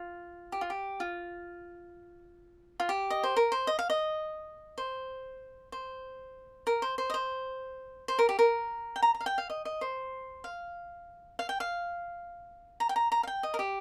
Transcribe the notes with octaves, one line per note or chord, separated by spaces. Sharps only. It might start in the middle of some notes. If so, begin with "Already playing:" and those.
Already playing: F4
G4
F4
G4
F4
F4
G4
D#5
C5
A#4
C5
D#5
F5
D#5
C5
C5
A#4
C5
C5
D#5
C5
C5
A#4
G4
A#4
G5
A#5
A#5
F5
G5
F5
D#5
D#5
C5
F5
F5
G5
F5
A#5
G5
A#5
A#5
F5
G5
D#5
A#4
G4